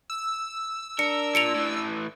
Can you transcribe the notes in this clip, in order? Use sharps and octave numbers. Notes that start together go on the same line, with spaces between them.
E6
D4 A#4 C#7
A#2 C#7 D7 F7
A2 E3